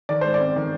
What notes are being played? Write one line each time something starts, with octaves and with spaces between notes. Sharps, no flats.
D#3 D5
G#2 C5
D5
C4
D#3